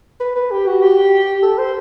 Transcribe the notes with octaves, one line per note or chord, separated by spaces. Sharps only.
B4
B4
G4
F#4
G4
A4
C5